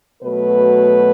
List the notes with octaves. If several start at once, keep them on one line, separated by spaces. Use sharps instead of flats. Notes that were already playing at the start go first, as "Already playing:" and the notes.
B2 F#3 A3 B4